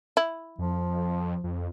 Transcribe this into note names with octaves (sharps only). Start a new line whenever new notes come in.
E4
F2 F3
F2